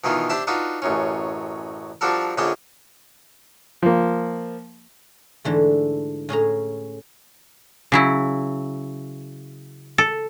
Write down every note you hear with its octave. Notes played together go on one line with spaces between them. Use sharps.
B2 D#3 E3 D#4 F4
D4 G4 C5 E5 A5 B5
D4 D#4 F4 F#4 B4
A1 F#2 C#4
F3 G3 D4 F#4 A4 A#4
A#1 D3 C#4 D4 D#5 G5
F3 A#3
G#2 D3 E3 A3
A2 C#4 G#4 A#5
C#3 F#3 E4
A4